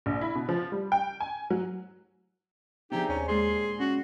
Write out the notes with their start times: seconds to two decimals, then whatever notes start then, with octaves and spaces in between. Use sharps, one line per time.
0.06 A#1
0.21 E4
0.35 B2
0.49 F3
0.72 G3
0.92 G5
1.20 G#5
1.50 F#3
2.92 C3 F3 B3 D4 D#4 G4 G#4
3.09 D#2 C#4
3.28 A#2 G#3 G#4 C6
3.80 C#4 F#4